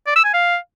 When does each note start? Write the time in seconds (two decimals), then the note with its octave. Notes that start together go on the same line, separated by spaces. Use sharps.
0.07 D5
0.16 E6
0.25 G#5
0.34 F5